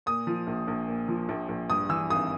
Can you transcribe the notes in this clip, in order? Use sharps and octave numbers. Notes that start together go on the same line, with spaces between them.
A#2 D#6
F3
A#1
A#1
A#2
F3
A#1
A#1
G2 D#6
E3 E6
G#1 D#6